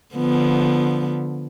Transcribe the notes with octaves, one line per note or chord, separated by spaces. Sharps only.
D3 F3 B3